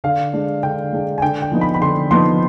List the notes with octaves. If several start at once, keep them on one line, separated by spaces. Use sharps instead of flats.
D3 F5
G#3 D4
D3 G5
G#3 D4
G#5
D3 G5
G5
F3 B3 D#4
B5
B5
D3 C6
F3 B3 D#4 C6